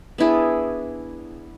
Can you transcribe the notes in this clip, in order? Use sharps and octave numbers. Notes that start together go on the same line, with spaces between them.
B3 D4 E4 G#4